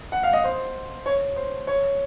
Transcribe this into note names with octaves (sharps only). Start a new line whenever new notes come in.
F#5
F5
D#5
C5
C#5
C5
C#5